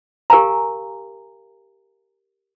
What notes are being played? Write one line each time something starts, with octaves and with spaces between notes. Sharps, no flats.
G4 A#4 F5 G#5 A#5